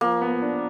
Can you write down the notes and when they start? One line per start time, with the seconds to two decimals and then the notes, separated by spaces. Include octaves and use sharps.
0.01 F3 A#3
0.21 B3
0.42 D4